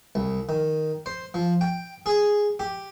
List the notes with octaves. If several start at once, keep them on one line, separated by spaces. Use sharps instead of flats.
C2
D#3
C5
F3
G5
G#4
G4